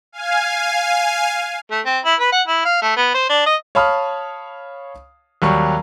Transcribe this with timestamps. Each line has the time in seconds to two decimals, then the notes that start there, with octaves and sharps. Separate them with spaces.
0.12 F5 G#5
1.71 A3
1.85 C4
2.05 E4
2.20 B4
2.32 F#5
2.47 E4
2.65 F5
2.82 A3
2.96 B3
3.14 C5
3.29 D4
3.46 D#5
3.75 C#5 F5 A5 B5 D#6 F6
5.42 D#2 F#3 G3 C#6